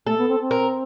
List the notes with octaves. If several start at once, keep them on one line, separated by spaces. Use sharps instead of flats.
A3 A4
B3
C4
C4
A#4